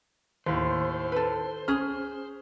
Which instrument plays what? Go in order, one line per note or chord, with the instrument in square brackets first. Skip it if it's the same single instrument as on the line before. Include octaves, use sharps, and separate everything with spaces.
[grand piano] D#2 A2 [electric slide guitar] C5
[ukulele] A4 B4
[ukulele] C#4 G#4 [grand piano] F6